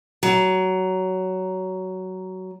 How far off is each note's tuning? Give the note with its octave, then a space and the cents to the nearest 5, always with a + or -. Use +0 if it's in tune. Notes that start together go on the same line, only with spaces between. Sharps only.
F#3 +15